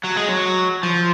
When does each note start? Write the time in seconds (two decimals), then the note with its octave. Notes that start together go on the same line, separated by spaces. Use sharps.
0.05 F#3
0.17 G#3
0.29 F#3
0.83 F3